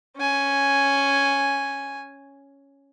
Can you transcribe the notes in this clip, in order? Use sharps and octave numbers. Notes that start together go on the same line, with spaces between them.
C#4 G#5